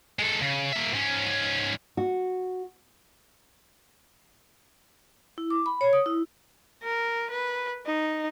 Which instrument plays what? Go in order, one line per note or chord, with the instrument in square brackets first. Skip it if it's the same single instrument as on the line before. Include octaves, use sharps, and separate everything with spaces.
[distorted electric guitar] G#3 A4
C#3
A#3 E5
G#2 C#4
[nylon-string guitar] F#4
[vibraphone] E4
D6
B5
C#5
D#6
E4
[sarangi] A#4
B4
D#4